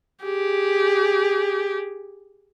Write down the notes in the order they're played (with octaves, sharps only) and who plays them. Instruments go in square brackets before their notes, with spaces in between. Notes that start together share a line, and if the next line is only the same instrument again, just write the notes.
[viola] G4 G#4